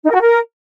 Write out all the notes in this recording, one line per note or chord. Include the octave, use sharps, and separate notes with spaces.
D#4
A#4
F#4
A#4